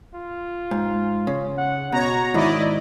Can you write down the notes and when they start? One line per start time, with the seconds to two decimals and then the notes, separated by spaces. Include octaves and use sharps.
0.15 F4
0.71 G#2
1.27 C#3
1.58 F#5
1.92 B2 F#4 C#5 A#5
2.34 G#2 D#3 E4 D5 D#5